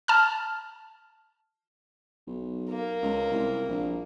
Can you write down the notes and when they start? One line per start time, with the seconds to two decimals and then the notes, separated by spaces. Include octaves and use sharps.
0.08 A5 F6
2.27 B1
2.70 A#3
3.03 C#2
3.31 C2
3.69 A#1